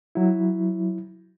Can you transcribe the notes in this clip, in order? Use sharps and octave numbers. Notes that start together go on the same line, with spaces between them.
F#3 E4